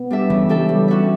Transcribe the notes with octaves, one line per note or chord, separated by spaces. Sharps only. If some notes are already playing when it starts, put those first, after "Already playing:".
Already playing: B3
G3 D4 A4 E5
C#3 E3
G3 D4 A4 E5
G3
C#4 F#4 A4 E5